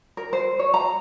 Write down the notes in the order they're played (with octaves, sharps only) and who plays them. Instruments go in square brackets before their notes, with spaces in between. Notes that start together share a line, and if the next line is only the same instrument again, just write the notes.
[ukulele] A#4
C5
C#5
A#5